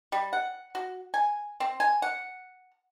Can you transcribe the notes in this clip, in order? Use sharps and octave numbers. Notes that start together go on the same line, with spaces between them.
G3
F#5
F#4
G#5
C4
G#5
F#5